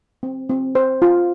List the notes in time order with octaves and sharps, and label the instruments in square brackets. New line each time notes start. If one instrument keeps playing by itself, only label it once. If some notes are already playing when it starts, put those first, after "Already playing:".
[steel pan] C4
C4
C5
F4